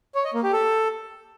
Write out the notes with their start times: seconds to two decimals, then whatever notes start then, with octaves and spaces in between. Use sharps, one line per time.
0.15 C#5
0.24 D#5
0.34 A#3
0.43 G4
0.53 A4